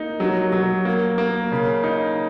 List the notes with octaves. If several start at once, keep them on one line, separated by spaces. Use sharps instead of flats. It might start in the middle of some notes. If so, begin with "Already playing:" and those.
Already playing: A#3 D#4
F#3
F#3
A#3
A#3
C#3
D#4